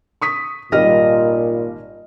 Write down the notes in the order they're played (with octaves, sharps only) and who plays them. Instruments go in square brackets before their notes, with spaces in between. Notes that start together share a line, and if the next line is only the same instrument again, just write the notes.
[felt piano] C#6 D#6 B6
[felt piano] G#1 G3 F6 [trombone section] A#2 [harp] D#5